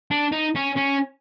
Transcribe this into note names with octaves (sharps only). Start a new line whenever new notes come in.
D4
D#4
C#4
C#4